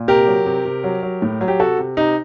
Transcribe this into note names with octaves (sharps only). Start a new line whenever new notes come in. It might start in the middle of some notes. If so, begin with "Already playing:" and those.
Already playing: A#2
C3 G4 A#4
F#3
C3
C3
F#3
F#3
A2
F#3
G4
C3 F#4 A4
C3
C3 D#4